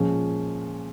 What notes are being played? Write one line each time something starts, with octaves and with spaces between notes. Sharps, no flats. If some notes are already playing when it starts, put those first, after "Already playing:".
Already playing: A#2 F3 G#3 C#4